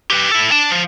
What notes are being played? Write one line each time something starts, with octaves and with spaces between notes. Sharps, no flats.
G4 B4
E4 A4
D4 A5
F3